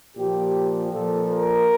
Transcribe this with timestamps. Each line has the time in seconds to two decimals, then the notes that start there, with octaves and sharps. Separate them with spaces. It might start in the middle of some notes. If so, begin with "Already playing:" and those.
0.16 A#2 F3 G4
0.92 A#2 F3 A4
1.30 A#4